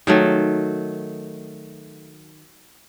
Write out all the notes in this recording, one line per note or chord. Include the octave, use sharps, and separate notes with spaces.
D#3 F#3 A3